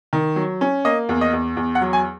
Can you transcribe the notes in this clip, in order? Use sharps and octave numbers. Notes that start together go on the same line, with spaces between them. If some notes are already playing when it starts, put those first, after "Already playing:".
D#3
F#3
C#4
A#3 D#5
E2
D#5
E2
E2
F#5
F#3
G#5